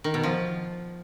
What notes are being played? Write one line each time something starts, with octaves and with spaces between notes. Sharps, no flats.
D#3
B2
F3